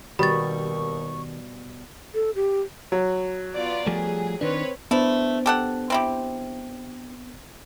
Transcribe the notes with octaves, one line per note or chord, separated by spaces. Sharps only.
D#2 B2 D#3 G3 B5 C#6 A6
A4
G4
F#3
B3 F4 D5
F3 G3 A3 G#4
D#3 C4 D4 B4 C#5
A3 B3 D4 E4 C5
G4 A4 F#5
C4 E4 G4